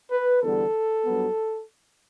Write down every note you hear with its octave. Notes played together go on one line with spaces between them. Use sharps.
B4
E2 D3 G3 B3 A4
G2 F#3 B3